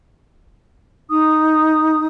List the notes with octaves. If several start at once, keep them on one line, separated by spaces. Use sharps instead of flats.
D#4 D#6